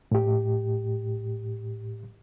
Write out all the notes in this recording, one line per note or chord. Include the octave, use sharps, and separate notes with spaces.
A2 G4